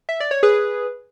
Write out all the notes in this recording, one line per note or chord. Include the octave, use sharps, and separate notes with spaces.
E5
D5
C#5
G#4 B4